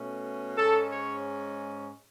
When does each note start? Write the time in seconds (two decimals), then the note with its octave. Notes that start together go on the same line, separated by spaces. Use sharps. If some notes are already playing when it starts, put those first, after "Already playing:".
Already playing: B2 A3 C#4
0.57 G#2 G#3 C#4 A4
0.91 C#5